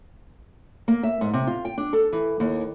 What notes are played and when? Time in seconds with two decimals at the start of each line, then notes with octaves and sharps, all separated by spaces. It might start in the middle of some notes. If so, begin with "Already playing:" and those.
0.88 A#3
1.03 E5
1.21 G#2
1.33 C3
1.47 F4
1.65 G5
1.78 D4
1.93 A4
2.13 E3
2.40 D#2